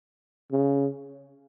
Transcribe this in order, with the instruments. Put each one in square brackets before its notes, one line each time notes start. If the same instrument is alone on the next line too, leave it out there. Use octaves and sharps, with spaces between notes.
[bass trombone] C#3